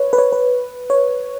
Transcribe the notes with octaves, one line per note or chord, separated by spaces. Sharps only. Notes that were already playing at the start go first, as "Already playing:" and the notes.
Already playing: B4 C#5
B4
C#5
B4
C#5